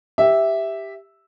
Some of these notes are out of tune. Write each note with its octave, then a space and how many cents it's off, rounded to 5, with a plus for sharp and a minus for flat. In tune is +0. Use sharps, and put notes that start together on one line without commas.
G4 +5 E5 -5